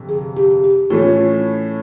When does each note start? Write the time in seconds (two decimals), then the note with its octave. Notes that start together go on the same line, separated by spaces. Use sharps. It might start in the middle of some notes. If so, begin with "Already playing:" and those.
Already playing: G1 F2 C3
0.09 G#4
0.37 G4
0.64 G4
0.90 A2 E3 A3 C#4 F4